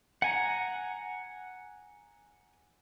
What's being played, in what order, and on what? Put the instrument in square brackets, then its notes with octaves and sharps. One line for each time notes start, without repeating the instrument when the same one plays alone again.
[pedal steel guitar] F#5 G#5 A#5